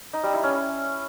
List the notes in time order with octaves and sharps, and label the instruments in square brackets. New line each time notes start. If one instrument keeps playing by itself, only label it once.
[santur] D#4
G3
E4
C#4